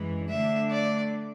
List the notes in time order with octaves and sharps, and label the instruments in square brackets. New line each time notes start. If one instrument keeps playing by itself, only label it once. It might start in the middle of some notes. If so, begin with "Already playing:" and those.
Already playing: [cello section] F#2 E3 G#3
[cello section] D3 A3 D4 [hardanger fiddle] E5
[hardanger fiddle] D5